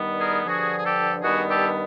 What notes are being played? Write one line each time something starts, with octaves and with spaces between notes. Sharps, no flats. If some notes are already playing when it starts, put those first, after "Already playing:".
Already playing: G2 D#3 G3 B3
G#4 A#4
G2 D3 F3 F#4 G#4
G#4
G4 A4
G2 D#3 G3 B3 F#4 G#4
G4 A4